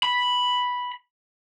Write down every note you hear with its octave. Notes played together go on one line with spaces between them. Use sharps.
B5